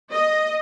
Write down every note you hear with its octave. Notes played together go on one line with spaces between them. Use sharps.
D#5